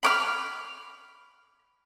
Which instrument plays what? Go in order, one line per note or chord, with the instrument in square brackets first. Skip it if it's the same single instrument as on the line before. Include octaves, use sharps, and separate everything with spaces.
[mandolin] B5 D6 F6